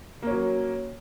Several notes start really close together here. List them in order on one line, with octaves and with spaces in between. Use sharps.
A#3 C#4 F#3